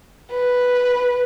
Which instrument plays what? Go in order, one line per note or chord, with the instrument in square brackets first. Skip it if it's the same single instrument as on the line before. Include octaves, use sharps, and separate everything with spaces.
[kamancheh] B4